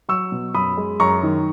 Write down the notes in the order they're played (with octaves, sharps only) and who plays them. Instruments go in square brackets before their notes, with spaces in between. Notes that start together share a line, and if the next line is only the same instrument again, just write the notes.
[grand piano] F#3 C#6 E6
B2
F#2 B5 D#6
G#3
F#2 A#5 C#6
D#3